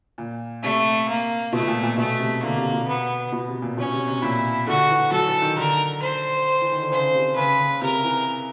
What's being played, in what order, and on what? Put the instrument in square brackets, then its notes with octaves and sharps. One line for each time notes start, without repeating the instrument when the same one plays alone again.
[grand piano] A#2
[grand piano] C3 [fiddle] A3
[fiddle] A#3
[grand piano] B2 [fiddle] A3
[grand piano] B2
A#2
A#2
[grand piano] B2 [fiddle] A3
[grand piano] C3
[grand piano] D3 [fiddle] A#3
[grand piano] C3
B2
[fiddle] B3
[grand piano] B2
C3
A#2
[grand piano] B2 [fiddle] C#4
[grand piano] C3
C3
[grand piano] A#2 [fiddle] E4
[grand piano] D3 [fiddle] F#4
[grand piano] E3
[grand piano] F#3 [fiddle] A4
[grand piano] E3
D#3
[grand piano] D3 [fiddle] A#4
[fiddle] C5
[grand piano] E3
D#3
D3
[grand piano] C#3 [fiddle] C5
[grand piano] C3
[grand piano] C#3 [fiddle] B4
[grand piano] C#3
[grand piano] C3 [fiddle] A#4
[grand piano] E3